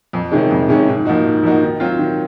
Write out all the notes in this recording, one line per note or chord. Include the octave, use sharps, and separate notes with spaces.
F2
C3 D#3 G#3 C#4
F2
C3 D#3 G#3 C#4
G#2
F3 A#3 D#4 F#4
G#2
F3 A#3 D#4 F#4
D#3
F#3 C4 F4
D#3